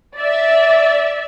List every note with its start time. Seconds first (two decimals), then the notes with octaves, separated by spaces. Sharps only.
0.19 D5 E5